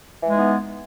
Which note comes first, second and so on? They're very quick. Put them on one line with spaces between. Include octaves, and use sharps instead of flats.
E3 G#3 D#4 B3